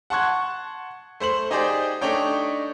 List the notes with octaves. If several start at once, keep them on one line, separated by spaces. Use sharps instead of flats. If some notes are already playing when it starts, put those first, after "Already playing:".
F#5 A5 C6 C#6 F#6 G#6
A3 C5 C6 F#7
D#4 G4 G#4 C5 D5 G5
A3 D4 D#4 C#5 G5